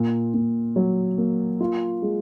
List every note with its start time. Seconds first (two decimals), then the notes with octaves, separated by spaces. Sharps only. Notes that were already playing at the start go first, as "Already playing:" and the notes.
Already playing: A#2
0.34 A#2
0.76 F#3
1.18 A#3
1.61 F4
2.02 G#3